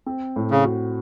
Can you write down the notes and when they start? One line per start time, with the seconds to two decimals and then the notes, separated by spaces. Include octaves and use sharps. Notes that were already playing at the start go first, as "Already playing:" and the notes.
0.06 C4
0.36 A2
0.51 C#3
0.65 F#4